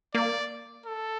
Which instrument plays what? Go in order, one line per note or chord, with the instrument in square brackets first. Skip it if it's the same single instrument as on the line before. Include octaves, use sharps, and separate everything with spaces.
[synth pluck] A#3 [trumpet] D5
[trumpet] A4